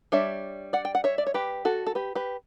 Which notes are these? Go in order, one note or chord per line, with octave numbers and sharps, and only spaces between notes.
G3 D4 C#5 E5
D5 F#5
G5
F#5
C#5 E5
D5
C#5
G4 B4
F#4 A4
A4
G4 B4
G4 B4